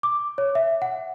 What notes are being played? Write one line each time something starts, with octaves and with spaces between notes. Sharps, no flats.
D6
C#5
E5
F#5